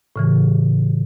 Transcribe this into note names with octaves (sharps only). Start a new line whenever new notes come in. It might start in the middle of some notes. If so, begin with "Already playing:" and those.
A2 C#3 E3